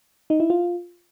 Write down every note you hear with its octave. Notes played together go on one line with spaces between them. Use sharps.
D#4
E4
F4